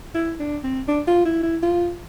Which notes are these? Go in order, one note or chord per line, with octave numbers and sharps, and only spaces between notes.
E4
D4
C4
D4
F4
E4
E4
F4